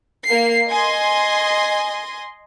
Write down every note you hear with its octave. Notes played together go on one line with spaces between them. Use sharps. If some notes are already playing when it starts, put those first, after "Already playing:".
A#3 C7
D#5 G#5 C6